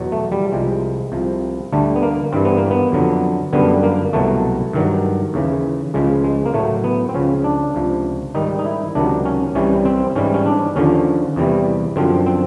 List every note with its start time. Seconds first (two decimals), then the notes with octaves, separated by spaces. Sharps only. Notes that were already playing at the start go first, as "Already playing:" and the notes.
Already playing: E2 B2 F#3
0.12 A3
0.32 G3
0.52 C2 C3 F3 G#3
1.12 C2 C3 F3
1.72 D2 D3 G3 A3
1.96 B3
2.02 A#3
2.32 G2 E3 G3 C4
2.45 B3
2.58 A#3
2.71 B3
2.92 F2 D3 F#3
3.53 F#2 D3 G3 B3
3.83 A#3
4.13 C2 B2 F#3 A3
4.73 G2 D#3 F#3
5.34 D#2 C#3 E3
5.94 C#2 C#3 F3 G#3
6.24 G#3
6.46 A#3
6.54 A2 F#3 A3
6.84 B3
7.09 C4
7.14 C#2 C#3 F3 C#4
7.44 D4
7.75 C#2 C3 F3
8.35 G#2 D#3 G3 D#4
8.59 D#4
8.65 E4
8.95 C#2 C3 D#3 F#3 D4
9.25 C#4
9.55 C2 C3 E3 G3 C#4
9.85 C4
10.15 G#2 E3 G3 C#4
10.34 C#4
10.46 D4
10.76 D#2 D3 F3 C#4
11.36 E2 C3 E3 G3
11.96 F#2 D3 F3 C4
12.26 C4